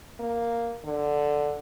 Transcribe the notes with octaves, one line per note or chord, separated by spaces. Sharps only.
A#3
D3